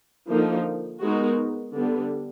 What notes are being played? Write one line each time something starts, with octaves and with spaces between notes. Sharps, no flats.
D3 F3 A#3 D#4
G#3 B3 D#4 F#4 A#4
D3 G3 B3